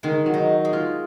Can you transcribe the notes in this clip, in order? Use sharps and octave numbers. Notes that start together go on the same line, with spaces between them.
D#3 G#3
F#3
D#4
G#3
F4